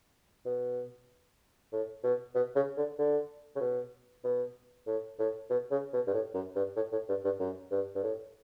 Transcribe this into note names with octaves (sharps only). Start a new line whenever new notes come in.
B2
A2
B2
B2
C#3
D3
D3
C#3
B2
B2
A2
A2
B2
C#3
B2
G2
A2
F#2
G2
A2
A2
G2
G2
F#2
G2
G2
A2